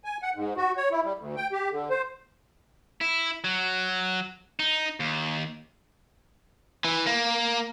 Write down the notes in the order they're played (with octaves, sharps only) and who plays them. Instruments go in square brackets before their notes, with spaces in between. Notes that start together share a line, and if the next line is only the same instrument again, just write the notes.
[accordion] G#5
F#5
G#2
F#4
C#5
E4
G3
D2
G5
G4
D3
C5
[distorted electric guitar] E4
F#3
D#4
D#2
[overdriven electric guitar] E3
A#3